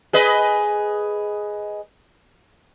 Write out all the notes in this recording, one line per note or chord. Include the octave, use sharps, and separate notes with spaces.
G#4 B4 D#5